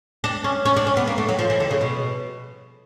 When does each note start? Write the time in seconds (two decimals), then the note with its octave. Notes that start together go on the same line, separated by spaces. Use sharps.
0.24 D4
0.44 C#4
0.65 C#4
0.76 D4
0.87 C#4
0.97 B3
1.07 A#3
1.18 A3
1.29 F#3
1.39 F3
1.50 E3
1.60 D3
1.71 C#3
1.81 B2